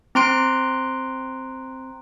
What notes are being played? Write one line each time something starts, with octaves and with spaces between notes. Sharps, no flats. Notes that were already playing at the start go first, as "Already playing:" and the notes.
C4 A#5 C6 F#6 D7